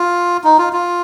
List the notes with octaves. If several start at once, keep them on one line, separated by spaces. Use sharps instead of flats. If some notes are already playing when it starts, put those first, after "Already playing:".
Already playing: F4
D#4
F4
F4